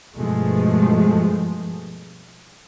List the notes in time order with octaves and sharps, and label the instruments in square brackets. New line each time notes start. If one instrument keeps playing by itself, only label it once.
[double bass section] G2 B2 F3 G#3 A3